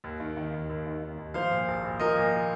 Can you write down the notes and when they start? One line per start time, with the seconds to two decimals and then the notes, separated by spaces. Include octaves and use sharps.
0.04 D#2
0.20 D#3
0.37 D#3
0.54 D#2
0.70 D#2
0.87 D#3
1.03 D#3
1.18 D#2
1.34 F3 C5 F5
1.51 A#2
1.68 A#1
1.84 A#1
2.00 F3 A#4 D#5
2.16 A#2